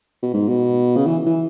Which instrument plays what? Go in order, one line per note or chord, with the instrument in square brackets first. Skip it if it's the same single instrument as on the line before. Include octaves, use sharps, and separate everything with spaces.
[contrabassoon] B2
G#2
B2
C#3
E3
E3